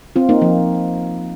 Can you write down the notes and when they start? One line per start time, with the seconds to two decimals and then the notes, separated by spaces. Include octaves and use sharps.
0.16 C4 F4
0.29 A#3 D#4
0.41 F3 A#3